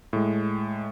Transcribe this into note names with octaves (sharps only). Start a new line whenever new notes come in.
A2 G#3